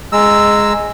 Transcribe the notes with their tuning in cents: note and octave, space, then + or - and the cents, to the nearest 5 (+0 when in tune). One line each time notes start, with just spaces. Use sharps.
G#3 +0 A#5 -10 E6 +0